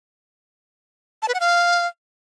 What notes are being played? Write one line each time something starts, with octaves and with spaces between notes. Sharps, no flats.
A5
B4
F#5
F5